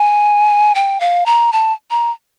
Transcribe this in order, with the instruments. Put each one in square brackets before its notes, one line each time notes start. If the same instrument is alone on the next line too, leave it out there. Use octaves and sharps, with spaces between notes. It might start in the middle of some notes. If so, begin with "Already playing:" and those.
Already playing: [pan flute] G#5
G5
F5
A#5
A5
A#5